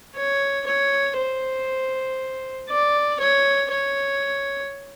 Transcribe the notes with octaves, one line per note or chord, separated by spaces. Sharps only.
C#5
C#5
C5
D5
C#5
C#5